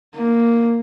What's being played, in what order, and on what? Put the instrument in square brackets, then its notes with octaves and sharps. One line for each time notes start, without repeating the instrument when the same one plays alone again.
[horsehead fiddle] A#3